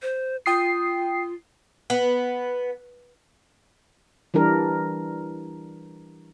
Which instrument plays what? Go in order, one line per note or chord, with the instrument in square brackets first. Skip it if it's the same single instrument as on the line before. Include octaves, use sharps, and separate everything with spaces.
[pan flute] C5
[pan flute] F4 [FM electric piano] G5 D#6 C7
[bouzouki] B3
[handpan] E3 G3 D4 A#4